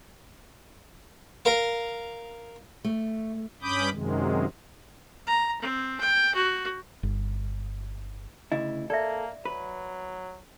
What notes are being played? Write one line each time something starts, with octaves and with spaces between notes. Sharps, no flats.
A#4 F5
A3
G2 C#4 B5 D6 D#6 G6
F#2 C3 D#3 G#3
A#5
C4
G5
F#4
G1
D2 C#3 E4 D#5
A#3 A4 D5 E5
F#3 B4